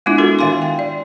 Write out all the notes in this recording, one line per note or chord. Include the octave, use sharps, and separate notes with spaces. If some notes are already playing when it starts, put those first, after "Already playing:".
G#3 B3 D4 E4 F4 E5
D4 F#4 A4 A#4
D#3 E5 F5 G#5 C6
G5
D5